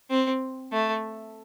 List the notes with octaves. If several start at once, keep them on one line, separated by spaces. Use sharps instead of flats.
C4
A3